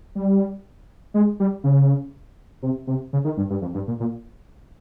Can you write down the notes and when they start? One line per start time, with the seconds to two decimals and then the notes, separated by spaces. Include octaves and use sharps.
0.15 G3
1.14 G#3
1.40 G3
1.64 C#3
2.62 C3
2.87 C3
3.13 C#3
3.25 D#3
3.37 G2
3.50 G2
3.62 F2
3.74 G2
3.87 A#2
4.00 A#2